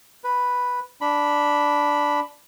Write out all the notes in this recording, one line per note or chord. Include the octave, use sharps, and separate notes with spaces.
B4
D4 B5